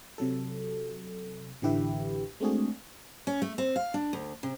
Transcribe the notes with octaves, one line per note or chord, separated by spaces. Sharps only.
C3 F#3 A4
A1 D3 E3 G4 B4 E5
G#3 A3 C4 D4 F#4 G#4
C#4
A3
C4
F5
D4
D2
C3